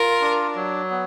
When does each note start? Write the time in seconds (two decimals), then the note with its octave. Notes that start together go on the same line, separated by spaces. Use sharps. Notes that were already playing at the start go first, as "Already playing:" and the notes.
Already playing: F4 A#4
0.21 D4
0.55 F#3
0.90 B3